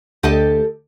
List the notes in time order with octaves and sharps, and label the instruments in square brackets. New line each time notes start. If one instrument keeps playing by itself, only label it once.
[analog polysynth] D2 [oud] G4 A4 D#5